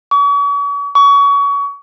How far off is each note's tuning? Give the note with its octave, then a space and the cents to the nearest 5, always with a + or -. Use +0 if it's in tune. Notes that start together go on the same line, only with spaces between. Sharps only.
C#6 +45
C#6 +30